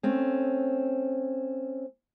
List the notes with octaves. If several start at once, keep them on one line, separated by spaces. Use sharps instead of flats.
A3 C4 C#4